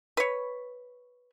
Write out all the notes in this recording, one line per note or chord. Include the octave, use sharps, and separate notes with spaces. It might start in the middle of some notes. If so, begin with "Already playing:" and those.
B4 C#5